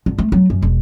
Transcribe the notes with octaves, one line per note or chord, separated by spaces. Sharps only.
G1
A3
F#3
F#2
E1